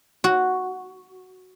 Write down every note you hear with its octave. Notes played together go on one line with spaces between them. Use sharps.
F#4